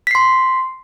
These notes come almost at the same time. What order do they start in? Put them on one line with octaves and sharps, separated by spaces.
B6 C7 C6